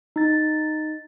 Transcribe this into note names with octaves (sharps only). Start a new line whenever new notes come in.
D#4 A6